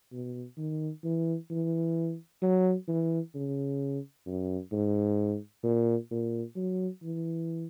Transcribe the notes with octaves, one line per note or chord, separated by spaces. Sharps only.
B2
D#3
E3
E3
F#3
E3
C#3
F#2
G#2
A#2
A#2
F#3
E3